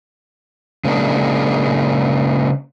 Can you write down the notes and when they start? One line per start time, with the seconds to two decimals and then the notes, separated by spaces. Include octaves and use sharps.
0.85 C#3 G#3 A#3 D4